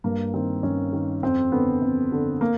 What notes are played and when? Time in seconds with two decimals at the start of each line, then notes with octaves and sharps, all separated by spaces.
0.04 G2 A#3
0.34 D#3 C4
0.63 G2 C#4
0.93 D#3
1.23 F2 C4
1.52 D3 B3
1.82 F2
2.12 D3
2.41 A#3